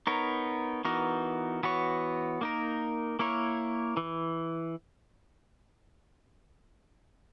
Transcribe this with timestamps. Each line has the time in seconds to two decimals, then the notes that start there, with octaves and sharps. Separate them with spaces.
0.07 B3 D#4 A#4 C#5
0.85 E3 B3 D#4 F#4 A#4
1.63 E3 B3 F#4 C#5
2.41 A#3 D#4 A#4
3.19 A#3 E4 A#4 C#5
3.97 E3